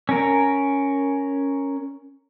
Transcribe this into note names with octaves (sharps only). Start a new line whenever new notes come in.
C#4 A#4